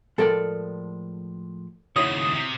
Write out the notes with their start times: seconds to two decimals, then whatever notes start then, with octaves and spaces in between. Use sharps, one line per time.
0.18 A2 F3 G#3 A4 A#4 D5
1.96 D#2 C#3 E4 F#4 C#5 D#6
2.35 C3